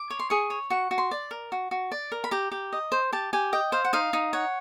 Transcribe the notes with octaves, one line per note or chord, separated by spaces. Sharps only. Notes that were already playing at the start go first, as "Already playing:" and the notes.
Already playing: D6
C#5
C6
G#4 C#6
C#5
F#4 C#6
F#4
C6
D5
A#4
F#4
F#4
D5
A#4
B5
G4 A#5
G4
D#5
C5
G4 A5
G4 G#5
D#5 G5
C5 F5
F#5
D#4 F5
D#4
C#5 F#5